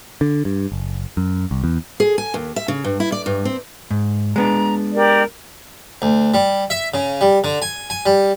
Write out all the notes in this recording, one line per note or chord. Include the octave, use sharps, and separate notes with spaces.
D3
G2
F#1
F#2
C2
E2
G#4
G#5
D#2
E5
C#3
G2
E4
D5
G2
C4
G#2
G#3 B3 D4 A#5
G4 A#4 D5
D2
G3
E5
C#3
G3
D3
G#5
G#5
G3